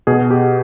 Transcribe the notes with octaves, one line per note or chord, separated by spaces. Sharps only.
B2 G#4
G4